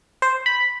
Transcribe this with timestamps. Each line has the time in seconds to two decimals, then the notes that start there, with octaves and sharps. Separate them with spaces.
0.22 C5
0.46 B5